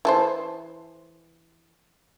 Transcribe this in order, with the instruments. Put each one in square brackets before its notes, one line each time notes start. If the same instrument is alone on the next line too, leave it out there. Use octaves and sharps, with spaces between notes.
[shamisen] E3 A4 C5